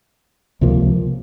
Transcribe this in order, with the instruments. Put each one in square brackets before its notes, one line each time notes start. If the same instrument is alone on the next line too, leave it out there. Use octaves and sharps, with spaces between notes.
[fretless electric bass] C#2 C3 F3 A#3